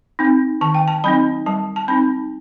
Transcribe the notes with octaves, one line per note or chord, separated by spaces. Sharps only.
C4 D#4
D#3 A5
G5
A5
F#3 C4 D#4 B5
G3 A5
A5
C4 D#4 B5